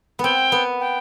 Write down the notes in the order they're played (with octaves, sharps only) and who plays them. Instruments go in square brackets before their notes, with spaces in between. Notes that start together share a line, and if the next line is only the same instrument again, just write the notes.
[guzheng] B3 C4 [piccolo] G5
[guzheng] B3
[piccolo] G5